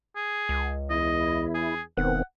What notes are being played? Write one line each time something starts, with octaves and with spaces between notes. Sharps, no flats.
G#4
C#2
E2 E4 D#5
G#4
E1 D#3 B3 C4 F#5